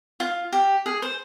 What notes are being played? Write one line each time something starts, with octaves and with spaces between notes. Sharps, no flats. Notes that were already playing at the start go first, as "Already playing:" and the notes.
F4
G4
G#4
C5